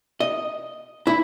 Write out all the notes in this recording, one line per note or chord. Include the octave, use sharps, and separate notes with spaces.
D#5
E4